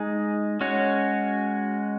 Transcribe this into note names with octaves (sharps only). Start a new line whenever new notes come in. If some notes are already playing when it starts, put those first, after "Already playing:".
Already playing: G#3 D#4 G#4
G#3 C#4 F#4 C#5